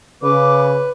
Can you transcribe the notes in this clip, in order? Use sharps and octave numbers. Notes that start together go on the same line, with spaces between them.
C#3 B4 D6